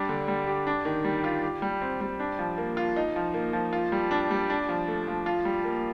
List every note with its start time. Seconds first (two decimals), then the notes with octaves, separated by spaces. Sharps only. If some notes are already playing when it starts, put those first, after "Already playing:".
Already playing: G3 D4
0.09 D3
0.28 G3
0.47 G4
0.67 D4
0.85 D#3
1.05 G3
1.24 F4
1.43 G4
1.62 G3
1.82 C4
2.01 G3
2.20 D4
2.39 F3
2.58 A#3
2.77 F4
2.96 D#4
3.16 F3
3.34 A#3
3.53 F3
3.73 F4
3.92 G3
4.11 D4
4.31 G3
4.50 D4
4.69 F3
4.88 A3
5.08 F3
5.26 F4
5.45 G3
5.65 A#3